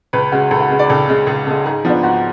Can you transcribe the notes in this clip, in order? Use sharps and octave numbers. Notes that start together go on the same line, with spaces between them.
C#2 B4
C#3 G#3 F#4
C#2 A4
F#4
C#3 G#3
D5
C#2 A4
C#3 G#3
C#2 G#4
C#3 G#3 A4
G#2 G#4
F3 B3 D4
G#2 F#4